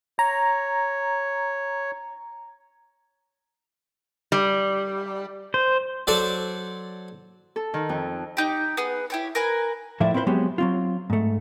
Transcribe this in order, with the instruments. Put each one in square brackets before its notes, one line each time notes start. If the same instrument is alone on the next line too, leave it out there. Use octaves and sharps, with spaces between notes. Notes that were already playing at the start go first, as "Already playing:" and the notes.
[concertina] C#5 [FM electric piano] A#5
[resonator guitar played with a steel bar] G3
[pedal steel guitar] C5
[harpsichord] F#3 A4 C5 D5
[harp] A4
D#3
F2
[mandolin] D#4 G4
B3 G#4
E4 G4 C#5
A#4 B4 G#5
[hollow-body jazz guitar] A2 F3 A3 E4 D5 E5
C4 E4 F4 B4 C5
F#3 G#3 B3 C4 G4 G#4
F#3 C4 F4
G#2 A3